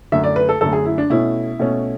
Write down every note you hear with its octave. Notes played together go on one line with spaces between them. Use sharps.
F#2 D3 A3 E5
D5
B4
A4
F#2 D3 A3 A4
G#4
E4
D4
B2 A3 C#4 E4
B2 A3 C#4